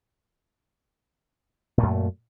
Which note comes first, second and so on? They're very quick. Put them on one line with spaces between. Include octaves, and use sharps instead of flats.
A#2 A3 F#2